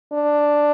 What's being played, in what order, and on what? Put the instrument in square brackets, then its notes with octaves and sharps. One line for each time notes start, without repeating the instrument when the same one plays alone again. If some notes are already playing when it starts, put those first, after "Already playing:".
[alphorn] D4